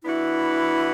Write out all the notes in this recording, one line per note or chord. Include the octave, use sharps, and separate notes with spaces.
E3 B3 D4 E4 F#4